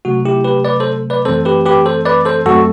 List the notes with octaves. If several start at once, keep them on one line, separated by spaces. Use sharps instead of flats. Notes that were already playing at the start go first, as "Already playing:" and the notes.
C3 F#3 A3 C4 F#4
E4 G4
G4 B4
B4 D5
A4 C5
B4 D5
F#2 E3 A3 C4 A4 C5
G4 B4
G4 B4
A4 C5
B4 D5
A4 C5
F#2 F#3 A3 C4 F#4 A4